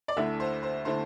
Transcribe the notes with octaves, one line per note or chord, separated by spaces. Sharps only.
D5
D2 D3 A3 E4 E5
C5
C5
D3 A3 E4 C5